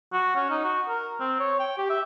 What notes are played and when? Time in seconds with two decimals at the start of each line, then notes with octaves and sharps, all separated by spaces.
0.13 F#4
0.36 C#4
0.50 D#4
0.64 F#4
0.89 A#4
1.20 C4
1.40 C#5
1.60 G5
1.78 G4
1.90 E5